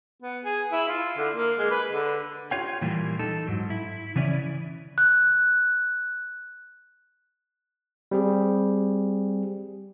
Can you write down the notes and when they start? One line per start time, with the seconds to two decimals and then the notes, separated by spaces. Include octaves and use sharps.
0.23 B3
0.44 G#4
0.72 E4
0.89 F4
1.18 D3
1.35 A#3
1.59 G#3
1.71 B4
1.91 D3
2.51 F4 G4 C#5 F5 G5
2.81 A#2 E3 G3 A#3
3.19 D#4 A4
3.47 G#2 F#3
3.70 E4
4.16 C#3 E3 C#4 E4 D5
4.98 F#6
8.11 G3 C4 G#4